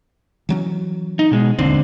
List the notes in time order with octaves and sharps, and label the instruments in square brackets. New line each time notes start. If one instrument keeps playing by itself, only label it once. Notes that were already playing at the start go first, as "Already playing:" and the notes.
[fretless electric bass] E3 F#3 C#4
[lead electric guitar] D#4
B2 G#3
[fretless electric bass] D1 G#1 D#2 [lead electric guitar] D3 C4